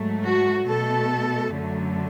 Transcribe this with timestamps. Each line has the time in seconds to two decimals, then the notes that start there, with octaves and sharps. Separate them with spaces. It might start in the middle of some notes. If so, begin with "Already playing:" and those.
Already playing: G#2 F#3 A3
0.23 F#4
0.65 B2 A3 A4
1.52 F#2 D3 F#3 A3